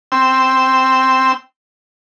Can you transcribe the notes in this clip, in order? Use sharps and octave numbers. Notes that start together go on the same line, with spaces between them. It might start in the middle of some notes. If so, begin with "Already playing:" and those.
C4 G5 E6